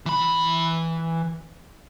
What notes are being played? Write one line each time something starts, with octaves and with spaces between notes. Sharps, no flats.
E3 B5